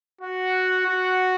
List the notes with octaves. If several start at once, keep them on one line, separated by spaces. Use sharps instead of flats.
F#4 F#5
F#4